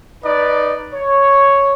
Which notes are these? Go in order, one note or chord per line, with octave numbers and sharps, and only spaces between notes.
D#4 B4 D5
C#5